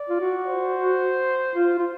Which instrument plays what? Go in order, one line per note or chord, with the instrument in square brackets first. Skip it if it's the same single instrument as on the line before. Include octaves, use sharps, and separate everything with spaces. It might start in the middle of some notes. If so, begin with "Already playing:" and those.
Already playing: [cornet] D5
[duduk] F4
F#4
[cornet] C5
[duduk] F4
F4